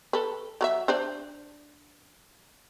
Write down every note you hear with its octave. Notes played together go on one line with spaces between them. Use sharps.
A4 B4
F#3 A#4 E5
D4 C5 D5